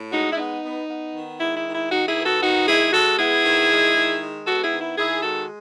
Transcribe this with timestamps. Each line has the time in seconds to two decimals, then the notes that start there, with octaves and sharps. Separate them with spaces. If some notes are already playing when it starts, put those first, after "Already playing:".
Already playing: A2
0.12 G#3 D#4 F#4
0.32 E4
0.37 B3 D#4
0.63 B3
0.88 B3
1.15 D#3
1.40 G#3 E4
1.57 E4
1.66 D#3
1.74 E4
1.91 D#3 D#4 F#4
2.08 E4 G#4
2.17 B3
2.25 F#4 A4
2.42 D#3 D#4 F#4
2.67 G#3 E4 G#4
2.93 G#3 F#4 A4
3.19 B3 E4 G#4
3.44 D#3
3.70 G#3
3.96 D#3
4.21 G#3
4.46 B3 F#4 A4
4.64 E4 G#4
4.72 D#3
4.81 E4
4.98 D#3 E4 G#4
5.23 G#3 F#4 A4